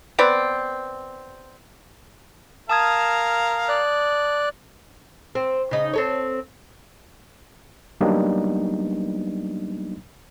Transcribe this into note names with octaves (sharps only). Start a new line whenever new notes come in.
B3 C4 D5
A#4 F5 A5 D#6 G#6
D5 F#6
C4
C#3 D#4
C4 A4 C#5
F#3 G3 A#3 B3 D4 D#4